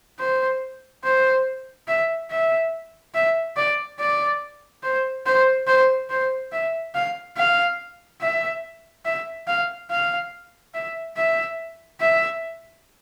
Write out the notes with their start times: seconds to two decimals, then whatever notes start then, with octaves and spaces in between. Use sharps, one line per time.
0.20 C5
1.04 C5
1.88 E5
2.30 E5
3.14 E5
3.57 D5
4.00 D5
4.83 C5
5.26 C5
5.67 C5
6.10 C5
6.52 E5
6.95 F5
7.37 F5
8.21 E5
9.05 E5
9.47 F5
9.90 F5
10.74 E5
11.17 E5
12.00 E5